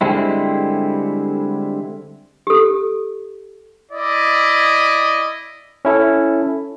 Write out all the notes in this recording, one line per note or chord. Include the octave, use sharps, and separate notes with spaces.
D3 G3 G#3 C4 E4
G4 A4
E4 D5 D#5
C#4 E4 A4